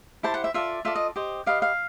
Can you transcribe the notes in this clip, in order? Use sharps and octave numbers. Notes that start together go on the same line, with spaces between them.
E4 G4 C5 A5
F#5
E5
F4 A4 D5 E5
F4 A4 D5 E5
D#5
G4 C5 D#5
G4 B4 D#5 F5
F5